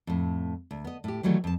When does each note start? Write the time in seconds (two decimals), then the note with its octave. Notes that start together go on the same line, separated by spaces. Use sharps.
0.07 F2 A2
0.71 D2
0.85 B3 D#5
1.04 A2 G4
1.23 D#3 E3 F#3 G3 A3
1.44 F2 A5